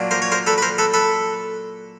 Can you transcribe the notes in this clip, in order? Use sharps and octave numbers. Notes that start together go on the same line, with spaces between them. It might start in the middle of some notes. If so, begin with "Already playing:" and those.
Already playing: A#2 F#3 A#3 D4
A#4 C5
C#5
A#4 C5
A4 B4
B4
A#4 C5
A4 B4
A4 B4